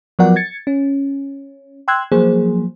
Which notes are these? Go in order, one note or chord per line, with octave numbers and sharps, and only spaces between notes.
F3 F#3 B3 A#4 D5 F#5
G#6 A6 C#7
C#4
G5 C6 E6 F#6 G#6
F3 F#3 A#3 G#4 C5